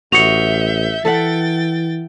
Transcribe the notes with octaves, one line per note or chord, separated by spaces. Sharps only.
A1 F#4 D#5 E5 G6 C#7 F7
E3 A4 E5 F#5 G5 A6